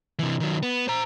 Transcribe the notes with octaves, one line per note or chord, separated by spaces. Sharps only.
C3 E3
D#3 F#3
B3
C5 A#5